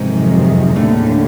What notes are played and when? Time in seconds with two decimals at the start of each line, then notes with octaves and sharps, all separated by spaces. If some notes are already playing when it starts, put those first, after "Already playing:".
Already playing: F2 G#2 C3 D#3 F#3 G#3
0.75 D#2 A2 D3 G3 A3 A#3 C#4